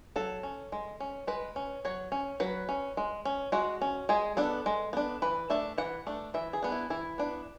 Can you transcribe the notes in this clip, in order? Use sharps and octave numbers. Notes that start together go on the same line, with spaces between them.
F#3 A4
C#4
G#3
C#4
G#3 B4
C#4
F#3 C#5
C#4
F#3 B4
C#4
G#3
C#4
G#3 F#4
C#4
G#3 G#4
B3 D4 A4
G#3
B3 D4
E3 B4
A3 D4 E5
E3 F#5
A3 D4
E3 E5
G#4
B3 D4
E4
E3 E4
B3 D4